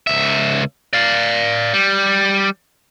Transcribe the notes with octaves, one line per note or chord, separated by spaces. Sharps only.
C#2 E5
D5 F5
G3